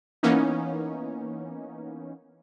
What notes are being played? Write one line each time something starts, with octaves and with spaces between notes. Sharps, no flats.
E3 A#3 B3 C#4 D#4